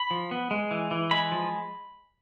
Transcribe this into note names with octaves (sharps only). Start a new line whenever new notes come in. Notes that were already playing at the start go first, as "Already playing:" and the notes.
Already playing: B5
F3
B3
G#3
E3
E3
G#3 B5
F3